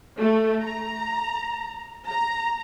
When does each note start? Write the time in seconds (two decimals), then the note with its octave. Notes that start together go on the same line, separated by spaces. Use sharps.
0.19 A3
0.62 A#5
2.08 A#5